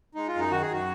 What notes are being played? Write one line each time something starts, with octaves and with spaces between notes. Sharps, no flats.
G#3 D#4
F4
F#2
D#4
D#3 F#4
G#4
F#2 F#4